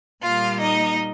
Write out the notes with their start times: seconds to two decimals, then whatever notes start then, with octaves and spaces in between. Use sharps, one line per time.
0.22 A#2 G3 A#3 F4 F5
0.60 D#4 D#5